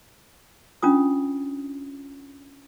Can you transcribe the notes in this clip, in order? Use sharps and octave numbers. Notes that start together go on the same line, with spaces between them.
C#4 D4 F4 D#6